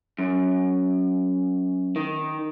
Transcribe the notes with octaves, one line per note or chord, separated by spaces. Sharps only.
F#2
D#3